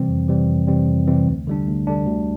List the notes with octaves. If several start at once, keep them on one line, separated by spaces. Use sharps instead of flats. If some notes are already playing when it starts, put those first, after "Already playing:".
Already playing: C3 E3 G3 C4
F2
C3 E3 G3 C4
F2
C3 E3 G3 C4
F2
C3 E3 G3 C4
D2
D3 G3 D4
D2
D3 G3 D4
D2